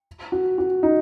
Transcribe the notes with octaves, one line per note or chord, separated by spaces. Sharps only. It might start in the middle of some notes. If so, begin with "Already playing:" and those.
F#4
F#4
D#4